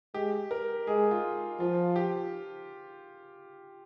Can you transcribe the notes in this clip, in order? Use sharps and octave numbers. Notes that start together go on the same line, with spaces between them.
G#3 G4
A#4
G#3 G#4
F4
F3 F4
G4